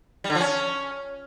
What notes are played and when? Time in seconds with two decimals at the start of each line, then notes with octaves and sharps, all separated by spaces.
0.24 G3
0.30 D3
0.35 F3
0.41 C#4